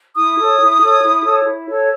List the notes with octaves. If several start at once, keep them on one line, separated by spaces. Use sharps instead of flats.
E4 D#6
A4 C#5
E4
A4 C#5
E4
A4 C#5
E4
A4 C#5